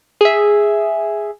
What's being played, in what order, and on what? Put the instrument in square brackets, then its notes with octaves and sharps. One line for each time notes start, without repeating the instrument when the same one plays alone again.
[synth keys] G#4 E5